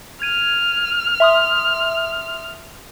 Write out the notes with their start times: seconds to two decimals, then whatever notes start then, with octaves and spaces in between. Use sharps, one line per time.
0.22 F6 G#6 D#7
1.20 E5 C6 D#6